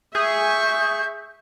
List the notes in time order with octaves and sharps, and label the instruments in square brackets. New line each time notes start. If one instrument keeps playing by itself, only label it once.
[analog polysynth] G#4 [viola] E5 C#6 [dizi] G6